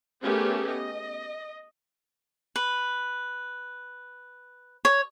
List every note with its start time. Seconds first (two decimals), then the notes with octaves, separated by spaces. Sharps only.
0.22 A3 B3 C#4 G4 G#4 A#4
0.67 D#5
2.56 B4
4.85 C#5